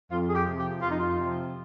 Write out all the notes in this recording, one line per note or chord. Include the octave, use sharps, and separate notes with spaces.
F2 F4
G#4
G4
C3 F3
G4
F2 F4
D#4
F4
C3 F3